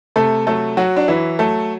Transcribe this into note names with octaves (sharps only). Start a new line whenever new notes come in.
C3 A3 A4
F#3 A3 A4
F#3 F#4
D4
E3 F#3 E4
F#3 A3 A4